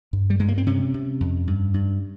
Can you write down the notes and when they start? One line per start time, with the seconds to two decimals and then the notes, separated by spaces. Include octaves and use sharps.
0.13 G2
0.30 G3
0.39 G2 G#3
0.48 A#3
0.58 C4
0.66 C3 C#4
0.94 C3
1.20 F2
1.47 G2
1.74 G2